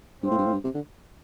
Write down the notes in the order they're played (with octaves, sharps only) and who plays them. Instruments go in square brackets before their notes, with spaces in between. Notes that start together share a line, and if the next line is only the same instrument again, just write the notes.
[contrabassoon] G2 [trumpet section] C4 F4 C5
[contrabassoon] A2
G2
A2
G2
C3
D3